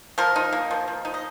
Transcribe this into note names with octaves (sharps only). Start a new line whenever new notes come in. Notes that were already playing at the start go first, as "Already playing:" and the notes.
F3 A#4
D#4
A#3
F3
F3
D#4
D#5